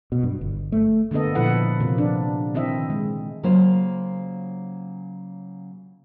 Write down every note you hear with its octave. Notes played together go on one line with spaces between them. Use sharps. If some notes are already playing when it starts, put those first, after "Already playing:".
B2
G2
G1
A3
D3 A#3 B3 A4 D#5
A#2 F3 E4 A4 B4 F#5
C3 F3 A#3
D4
D#3 C4 E4 D#5 E5
G#3
C#3 F#3 A#3 F4 C5